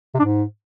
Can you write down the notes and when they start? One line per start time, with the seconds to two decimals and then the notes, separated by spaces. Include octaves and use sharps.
0.14 C3
0.19 D4
0.24 G#2